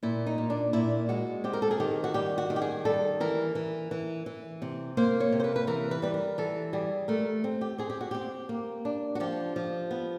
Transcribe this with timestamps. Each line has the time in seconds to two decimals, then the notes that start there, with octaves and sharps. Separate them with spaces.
0.03 A#2 E4
0.27 D#4
0.38 A#2
0.50 D4
0.73 A#2 E4
1.09 G#3 F#4
1.44 C4 G4
1.53 A#4
1.62 A4
1.71 G#4
1.80 D#3 G4
2.04 F#4
2.14 G3 G4
2.38 F#4
2.50 D#3
2.56 G4
2.62 G#4
2.85 G3 A4
3.20 E3 A#4
3.55 E3
3.91 E3
4.26 E3
4.62 C3
4.97 A#3 C5
5.20 C#5
5.32 C3
5.40 C5
5.44 B4
5.56 B4
5.67 E3 A#4
5.91 B4
6.02 G3 B4
6.14 A#4
6.38 E3 A4
6.73 G3 G#4
7.08 A3 A#4
7.44 C4
7.61 G4
7.78 C4 G#4
7.90 G4
8.01 F#4
8.11 C4 G4
8.49 A#3
8.85 D4
9.15 F#4
9.20 F3 G4
9.56 F3
9.91 B3